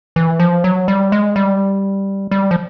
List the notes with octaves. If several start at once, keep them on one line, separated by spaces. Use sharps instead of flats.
E3
F3
F#3
G3
G#3
G3
G3
F3